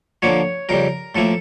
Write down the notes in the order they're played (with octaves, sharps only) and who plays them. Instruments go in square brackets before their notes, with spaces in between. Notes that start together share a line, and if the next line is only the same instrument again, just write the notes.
[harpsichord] D3 F3 A#3 C#5
F2 C#3 G3 A#4
A2 F3 A#3 E4 A4